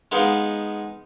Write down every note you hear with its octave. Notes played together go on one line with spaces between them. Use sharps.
G#3 B3 D#4 F5